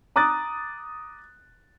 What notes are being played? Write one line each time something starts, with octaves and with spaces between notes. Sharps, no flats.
A#5 D6 D#6 F#6 A6